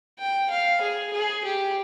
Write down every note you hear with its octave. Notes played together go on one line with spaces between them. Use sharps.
G5
F5
G#4
G#4
G4